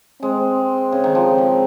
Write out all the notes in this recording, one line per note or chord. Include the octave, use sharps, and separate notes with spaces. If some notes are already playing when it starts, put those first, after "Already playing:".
G#3 C4
C#3
D#3
F3
C#3